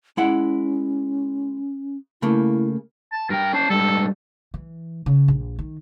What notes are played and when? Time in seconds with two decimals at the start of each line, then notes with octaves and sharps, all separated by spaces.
0.17 G#3 C#4 E4 F#5
2.22 C#3 A3 A#3 E4
3.12 A5
3.30 G2 A#4 G5
3.53 C#4 C5 A5
3.70 G#2 G3 A4
4.54 E3
5.06 C#3
5.28 A#1
5.59 D#3